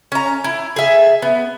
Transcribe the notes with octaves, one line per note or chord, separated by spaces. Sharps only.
C#4 A#5
E4
G#4 E5
B3